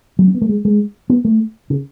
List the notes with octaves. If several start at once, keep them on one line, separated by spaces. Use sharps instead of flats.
F#3
C#4
B3
A3
G#3
G#3
B3
A3
C#3